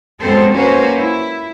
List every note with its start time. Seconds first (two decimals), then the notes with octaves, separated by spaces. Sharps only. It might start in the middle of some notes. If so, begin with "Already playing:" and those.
0.20 F#2 G#3 B3 C4 A4 C5
0.53 A#3 C#4 F#4 B4 C5
0.97 E4